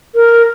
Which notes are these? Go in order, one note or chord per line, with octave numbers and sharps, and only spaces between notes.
A#4